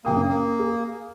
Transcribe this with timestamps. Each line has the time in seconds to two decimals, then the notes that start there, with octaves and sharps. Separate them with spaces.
0.05 F#1 A#3 G5 D#6
0.16 C#4
0.29 A#3
0.59 G#4